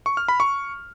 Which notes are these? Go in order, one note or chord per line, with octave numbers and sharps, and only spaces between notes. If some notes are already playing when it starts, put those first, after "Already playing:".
C#6
F6
B5
C#6